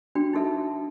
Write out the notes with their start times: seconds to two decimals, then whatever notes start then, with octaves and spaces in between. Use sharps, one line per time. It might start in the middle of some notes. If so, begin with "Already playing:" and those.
0.15 D4 F#4 G5
0.33 D#4 F#4 A4 E5 A5